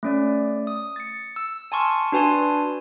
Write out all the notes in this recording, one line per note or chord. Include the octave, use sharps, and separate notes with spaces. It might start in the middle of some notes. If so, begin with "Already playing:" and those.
A3 C#4 D5
D#6
A6 C#7
E6
G#5 A5 C6 C#6 F6
D4 F#4 B4 G#5 A5 C6